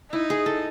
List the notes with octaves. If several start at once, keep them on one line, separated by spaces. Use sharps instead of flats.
D#4 E4
G#4
A4